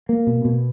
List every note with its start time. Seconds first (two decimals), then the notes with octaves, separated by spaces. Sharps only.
0.09 A#3
0.27 B2
0.45 B2